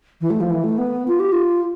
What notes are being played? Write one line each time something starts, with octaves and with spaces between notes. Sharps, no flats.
E3
A3
F3
E3
A3
B3
F4
G4
F4